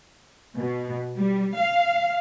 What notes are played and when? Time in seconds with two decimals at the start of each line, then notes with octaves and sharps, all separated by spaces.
0.58 B2
1.15 G3
1.57 F5